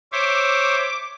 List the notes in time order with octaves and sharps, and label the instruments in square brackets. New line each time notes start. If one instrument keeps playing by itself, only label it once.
[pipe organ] C5 C#5 E5 [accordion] D6